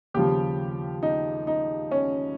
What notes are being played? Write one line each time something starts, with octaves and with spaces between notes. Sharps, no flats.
D#2 C#3 F3 G4
D#4
D#4
C#4